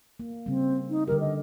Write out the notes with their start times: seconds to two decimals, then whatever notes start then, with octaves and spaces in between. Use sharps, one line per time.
0.20 A#3
0.46 C#3 G3 C4
0.90 D#4
1.08 D3 G3 G4 A#4
1.20 D#5